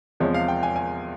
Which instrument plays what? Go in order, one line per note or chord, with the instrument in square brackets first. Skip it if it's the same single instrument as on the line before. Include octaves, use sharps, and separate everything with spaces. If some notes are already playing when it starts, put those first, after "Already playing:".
[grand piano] E2 C3 F3 G#3 C#5
F5
G5
G#5
G#5